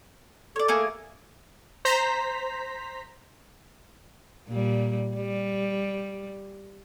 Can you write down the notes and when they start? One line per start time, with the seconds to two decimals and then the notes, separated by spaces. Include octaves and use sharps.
0.56 A4 C#5 D5
0.68 A3 A#3 G#4
1.85 C5 A#5 B6
4.48 A#2 G3
5.16 G3